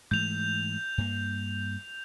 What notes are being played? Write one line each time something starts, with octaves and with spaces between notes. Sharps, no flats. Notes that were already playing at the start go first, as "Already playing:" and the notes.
G#2 E3 A3 G6 F7
G2 A#3